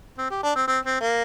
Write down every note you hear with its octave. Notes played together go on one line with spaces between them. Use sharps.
C4
G4
D4
C4
C4
C4
A#3